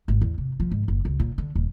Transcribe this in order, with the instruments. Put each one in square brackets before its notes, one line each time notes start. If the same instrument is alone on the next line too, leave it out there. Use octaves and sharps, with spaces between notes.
[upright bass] G#1
E2
C3
F3
G#2
F#1
C#2
A#2
D3
D#1